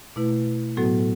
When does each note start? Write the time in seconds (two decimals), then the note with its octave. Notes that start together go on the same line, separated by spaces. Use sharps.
0.16 B2 A3 E4 B4
0.77 A2 F#3 B3 F#4 A4